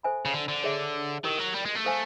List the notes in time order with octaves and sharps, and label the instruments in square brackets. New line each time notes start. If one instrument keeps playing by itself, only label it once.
[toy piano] A4 C5 E5 G#5 B5
[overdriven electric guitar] C#3
D3
D3
[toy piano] G#4 C#5 E5
[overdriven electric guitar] D#3 [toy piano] E4 G4 A#4
[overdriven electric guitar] F#3
G3
G#3
A3
[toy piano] A4 C5 F5 G#5